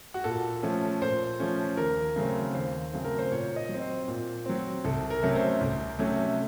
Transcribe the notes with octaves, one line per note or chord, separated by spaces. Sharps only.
F#4
A#2 A4
F3 A3 C#4
A#2 C5
F3 A3 C#4
D#2 A#4
C#3 F#3 A3 C4
D#2 C5
C#3 F#3 A3 C4
A#4
C5
A#2 C#5
D#5
F#3
C4
C5
A#2
F#3 C4
C2 A4
A#4
C3 F#3 A3 C#4
C5
C2
C3 F#3 A3 C#4